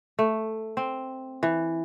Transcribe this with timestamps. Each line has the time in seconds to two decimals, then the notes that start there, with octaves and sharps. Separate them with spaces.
0.19 A3
0.77 C4
1.43 E3